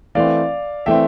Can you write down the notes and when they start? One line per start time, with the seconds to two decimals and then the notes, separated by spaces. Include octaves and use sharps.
0.15 E3 A3 C4 D5 F5
0.86 E3 A3 C4 E5 G5